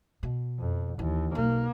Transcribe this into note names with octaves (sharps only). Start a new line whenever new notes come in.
B2
F2
D#2 E3
B1 A#3